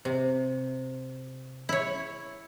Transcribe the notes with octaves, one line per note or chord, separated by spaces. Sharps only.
C3
E4 C#5